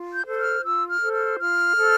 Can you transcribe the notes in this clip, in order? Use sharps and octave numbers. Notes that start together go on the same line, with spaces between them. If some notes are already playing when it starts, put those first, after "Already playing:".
Already playing: F4
G6
A4 C5
G6
F6
F4 E6
F6
A4 C5
F6
F4 F6
A4 C5